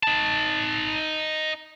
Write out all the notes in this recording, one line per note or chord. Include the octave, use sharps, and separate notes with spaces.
D#4 A5